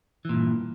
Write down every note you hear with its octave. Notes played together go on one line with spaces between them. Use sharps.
G2 A#2 E3